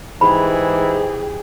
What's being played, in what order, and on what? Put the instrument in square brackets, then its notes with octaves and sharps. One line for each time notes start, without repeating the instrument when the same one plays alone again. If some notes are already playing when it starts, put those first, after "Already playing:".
[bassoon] G#2 [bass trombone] E3 [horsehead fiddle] G4 G#4 [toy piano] B5